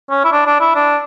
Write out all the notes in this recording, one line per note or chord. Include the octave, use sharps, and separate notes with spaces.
C#4
E4
D4
D4
E4
D4